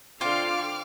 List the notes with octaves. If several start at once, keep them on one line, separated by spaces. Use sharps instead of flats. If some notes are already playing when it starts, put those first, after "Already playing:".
D3 C4 D4 F4 F5 C6 D6 F6